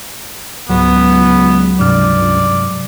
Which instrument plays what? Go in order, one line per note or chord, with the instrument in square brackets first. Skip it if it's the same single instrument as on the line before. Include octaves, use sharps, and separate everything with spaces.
[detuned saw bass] C#2 [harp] G#2 F#3 [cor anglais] B3
[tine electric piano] G2 C3 F6 [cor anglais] D5